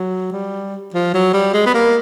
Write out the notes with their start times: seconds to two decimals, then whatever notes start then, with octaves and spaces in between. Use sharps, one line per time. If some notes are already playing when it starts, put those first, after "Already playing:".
Already playing: F#3
0.32 G3
0.94 F3
1.14 F#3
1.33 G3
1.54 G#3
1.66 B3
1.74 A#3